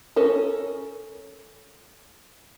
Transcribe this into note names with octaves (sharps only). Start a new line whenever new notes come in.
C#4 A4 A#4